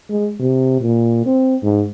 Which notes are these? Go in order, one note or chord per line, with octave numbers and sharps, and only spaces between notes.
G#3
C3
A#2
C4
G#2